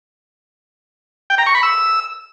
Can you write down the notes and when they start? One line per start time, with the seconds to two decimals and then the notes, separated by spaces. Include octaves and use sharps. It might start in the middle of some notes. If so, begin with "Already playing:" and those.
1.30 G5
1.38 A#5
1.46 C#6
1.55 B5
1.63 E6